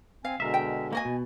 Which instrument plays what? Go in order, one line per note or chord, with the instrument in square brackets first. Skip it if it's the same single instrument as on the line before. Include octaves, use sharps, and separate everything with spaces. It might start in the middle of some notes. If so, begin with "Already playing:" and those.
[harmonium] C4 G#5 [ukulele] F5
[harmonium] B2 D3 G#3 [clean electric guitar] A#4 E5
[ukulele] G5
[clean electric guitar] A#3 [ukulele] F#4 D#5 G#5
[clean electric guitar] B2